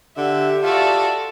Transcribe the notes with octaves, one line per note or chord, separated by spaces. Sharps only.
D3 G4 E5
F4 F#4 A4 D5 E5